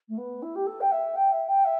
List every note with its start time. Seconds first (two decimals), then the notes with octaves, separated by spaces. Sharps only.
0.09 A3
0.17 B3
0.42 E4
0.55 G4
0.66 A4
0.81 G5
0.91 E5
1.16 G5
1.32 E5
1.48 G5
1.65 E5